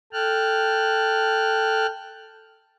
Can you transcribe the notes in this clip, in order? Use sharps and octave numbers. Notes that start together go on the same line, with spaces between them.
A4 G5 A5 F6 F#6